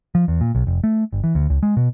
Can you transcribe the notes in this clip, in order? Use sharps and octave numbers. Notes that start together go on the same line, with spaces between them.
F3
E2
A#2
B1
F1
A3
G1
E3
D2
C#2
G#3
B2